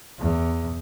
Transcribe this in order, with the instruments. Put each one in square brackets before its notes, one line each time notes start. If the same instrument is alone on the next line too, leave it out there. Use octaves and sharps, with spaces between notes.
[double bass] E2